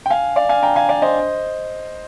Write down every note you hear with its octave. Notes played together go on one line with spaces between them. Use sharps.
G5
F5 G#5
D5 F5
F5 G#5
G5 A#5
F5 G#5
D5 F5
C5 D#5